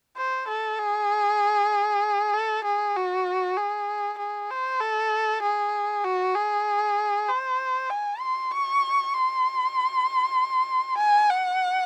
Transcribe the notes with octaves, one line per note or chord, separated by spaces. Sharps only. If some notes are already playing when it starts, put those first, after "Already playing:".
C5
A4
G#4
A4
G#4
F#4
G#4
G#4
C5
A4
G#4
F#4
G#4
C5
G#5
C6
C#6
C6
G#5
F#5